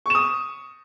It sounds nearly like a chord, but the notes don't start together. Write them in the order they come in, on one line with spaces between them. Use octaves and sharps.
C#6 E7 D#6